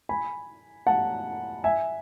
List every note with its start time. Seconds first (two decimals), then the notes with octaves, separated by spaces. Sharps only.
0.09 G#5 B5
0.87 F#5 A5
1.64 E5 G#5